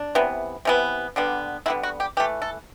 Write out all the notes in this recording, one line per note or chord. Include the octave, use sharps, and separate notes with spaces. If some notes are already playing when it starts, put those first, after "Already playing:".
Already playing: D4
C3 E3 B3
C3 E3 B3
D3 G3 B3
D3 G3 B3 E4
F#4
G4
E3 A3 G4
A4